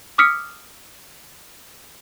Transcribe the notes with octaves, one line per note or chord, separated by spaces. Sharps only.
D6 D#6 F6 B6 C#7